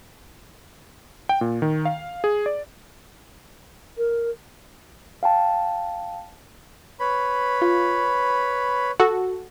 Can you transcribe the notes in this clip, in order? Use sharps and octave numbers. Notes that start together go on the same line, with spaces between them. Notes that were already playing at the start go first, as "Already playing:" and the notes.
G5
A#2
D#3
F5
G#4
D5
A#4
F5 G5 A5
B4 C#5 B5
F4
F#4 A4